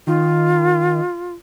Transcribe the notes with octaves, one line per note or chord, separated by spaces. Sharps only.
D#3 F4